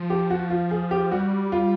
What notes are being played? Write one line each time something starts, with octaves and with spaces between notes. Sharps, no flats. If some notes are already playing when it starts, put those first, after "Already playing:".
Already playing: F3
G4
F#4
F4
G#4
G4
G3 F#4
F4